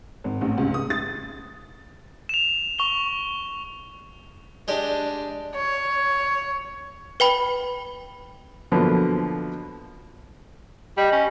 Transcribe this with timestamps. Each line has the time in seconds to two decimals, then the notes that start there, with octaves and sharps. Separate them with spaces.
0.24 G#1
0.41 A1
0.58 C#2
0.74 D#6
0.90 A6
2.29 E7 F7
2.79 C#6 F7 G7
4.68 G#3 D4 G4 D5
5.55 C#5
7.20 B4 G5 B5
8.72 B2 D3 F3 F#3 A#3 B3
10.97 G3 D#5
11.12 C#4